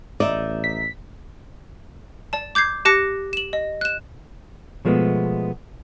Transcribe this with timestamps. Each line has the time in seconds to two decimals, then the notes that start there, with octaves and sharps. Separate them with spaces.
0.20 A1 D#4 D5 E5
0.64 B6
2.33 D5 A5
2.55 D6 G6 G#6 C7
2.85 G4 A5 D6 F#6 A#6 C#7
3.33 E7 F#7
3.53 D#5
3.81 F#6 E7
4.85 B2 F3 G#3 A3 B3